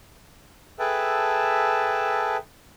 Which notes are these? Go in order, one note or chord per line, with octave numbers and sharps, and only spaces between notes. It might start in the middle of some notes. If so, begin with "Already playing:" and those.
G#4 A4 B4 E5 G5 A5